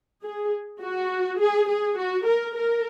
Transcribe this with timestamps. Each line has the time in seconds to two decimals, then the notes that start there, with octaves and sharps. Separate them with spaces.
0.23 G#4
0.81 F#4
1.40 G#4
1.69 G#4
1.98 F#4
2.26 A#4
2.56 A#4